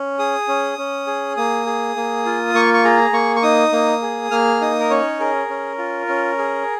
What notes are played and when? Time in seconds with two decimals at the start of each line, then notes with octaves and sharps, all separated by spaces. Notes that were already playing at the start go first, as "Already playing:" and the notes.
Already playing: C#4
0.19 G#4 D#6
0.48 C#4
0.78 C#4
1.07 G#4
1.37 A#3 D#6
1.66 G#4
1.96 A#3
2.25 F4
2.54 A#3 C#6
2.74 C#6
2.84 G#4 A#5
3.13 A#3 C#6
3.36 C#6
3.43 D#4 D#6
3.72 A#3
4.02 G#4
4.31 A#3 F6
4.61 D#4 D#6
4.79 A#4
4.90 C#4 C#5
5.20 G#4 A#4
5.49 C#4
5.78 F4
6.08 C#4
6.38 G#4